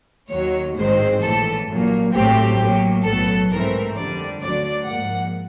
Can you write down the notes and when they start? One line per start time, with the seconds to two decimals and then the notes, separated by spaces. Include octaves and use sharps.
0.30 D#2 D#3 F#3 C#5
0.77 A1 G#2 D#3 G#3 C4 C5
1.22 A#1 A2 E3 A4
1.68 A#1 A#2 F#3 A#3
2.13 A1 A2 F#3 A3 C4 G4
2.59 A2 F#3 A#3
3.05 B1 A2 F#3 B3 A4
3.50 G#2 E3 A3 C4 A#4
3.96 F2 D3 G3 D5
4.42 D2 D3 F#3 D5
4.87 G#2 F3 A#3 F#5